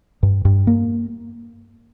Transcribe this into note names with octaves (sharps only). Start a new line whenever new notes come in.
G2
G2
A#3